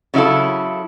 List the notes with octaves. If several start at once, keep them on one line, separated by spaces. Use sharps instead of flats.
C#3 F#3 E4 F4 A4